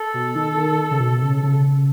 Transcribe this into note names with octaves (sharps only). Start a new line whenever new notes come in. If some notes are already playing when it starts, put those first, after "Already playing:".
Already playing: A4
B2
D#3
D#3
C#3
B2
C#3
C#3